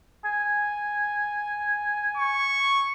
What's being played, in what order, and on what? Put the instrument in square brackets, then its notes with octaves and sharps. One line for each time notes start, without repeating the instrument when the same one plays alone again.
[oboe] G#5
[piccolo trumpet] C#6